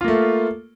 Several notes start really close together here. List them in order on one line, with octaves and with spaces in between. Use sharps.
F4 A#3 A3